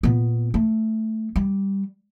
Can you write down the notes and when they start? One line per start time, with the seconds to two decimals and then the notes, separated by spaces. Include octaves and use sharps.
0.03 A#2 B3
0.54 A3
1.36 G3